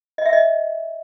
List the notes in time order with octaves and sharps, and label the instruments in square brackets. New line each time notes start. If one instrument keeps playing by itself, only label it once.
[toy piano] D#5
E5
D#5